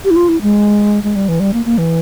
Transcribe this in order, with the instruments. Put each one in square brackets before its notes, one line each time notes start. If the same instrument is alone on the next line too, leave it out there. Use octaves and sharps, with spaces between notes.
[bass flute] G4
E4
F4
E4
G#3
G#3
G3
E3
G3
A#3
A#3
E3